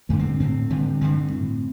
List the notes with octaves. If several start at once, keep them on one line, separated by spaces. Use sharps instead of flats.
G2 D3 A3
C4
A2 C4
G2 D3
G2 D3 C4
A2